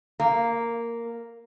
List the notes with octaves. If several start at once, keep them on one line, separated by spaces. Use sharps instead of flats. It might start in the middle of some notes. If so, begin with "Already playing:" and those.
A#3